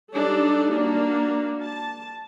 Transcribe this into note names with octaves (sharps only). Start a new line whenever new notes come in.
G3 D4 D#4 A4
A#3 D4 F#4
A5